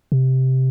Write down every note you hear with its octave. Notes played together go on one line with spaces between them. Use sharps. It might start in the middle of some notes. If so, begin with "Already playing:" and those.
C3